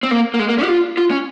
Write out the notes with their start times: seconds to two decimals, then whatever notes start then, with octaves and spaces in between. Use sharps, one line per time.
0.03 C4
0.11 A#3
0.34 A#3
0.39 G#3
0.49 A#3
0.58 C#4
0.64 G4
0.68 F4
0.97 F4
1.11 C#4